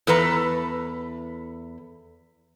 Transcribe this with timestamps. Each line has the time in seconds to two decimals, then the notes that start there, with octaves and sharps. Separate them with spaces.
0.07 E2 A4 B4 A#5